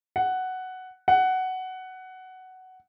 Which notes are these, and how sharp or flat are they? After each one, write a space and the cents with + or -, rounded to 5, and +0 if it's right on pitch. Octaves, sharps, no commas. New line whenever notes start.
F#5 +5
F#5 +10